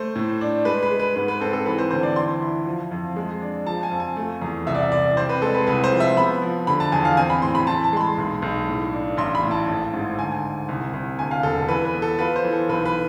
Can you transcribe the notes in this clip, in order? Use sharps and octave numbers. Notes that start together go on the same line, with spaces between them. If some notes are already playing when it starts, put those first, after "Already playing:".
Already playing: A3 C5
A2
D4
G#3 B4
B4
G#3
B4
G#2 B4
B4
C4 A4
A4
E3 B4
C5
D2 C5
D5
E3 C6
E4
F3
F2
G#3
D4
F3 A5
G#5
F2
G#5
A3
E2
C2 E5
D5
E5
C2 D5
C4 C5
B4
G#3 A4
B4
C2 B4
C5
F3
E5
B3 B5
F3
D3 B5
A5
E2 G#5
F5
C4 G#5
B5
A2 C6
B5
E3 A5
A5
G#3 C6
B5
B1
B1
A2
D4
A1 C6
B5
A2
A5
G#1
G#2
D2 G#5
D2
C2
C2
D2 G#5
F5
E1 A4
E3 B4
B4
B3
A4
F4 B4
C5
E3
A4
B1 B4
B4